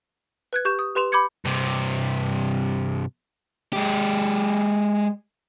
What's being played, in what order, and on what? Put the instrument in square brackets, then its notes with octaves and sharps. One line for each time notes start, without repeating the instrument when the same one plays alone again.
[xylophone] B4 F#6 G#6
G4 C#6 G6 E7
D#6
G4 B4 C6 E7 F7
B5 D6 G6 G#6 C#7
[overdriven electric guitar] G2 C3
G#3 G4